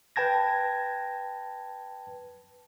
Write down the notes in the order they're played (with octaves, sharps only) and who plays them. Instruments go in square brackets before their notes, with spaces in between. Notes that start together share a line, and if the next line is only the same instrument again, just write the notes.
[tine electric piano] B4 G5 A5 G#6 A#6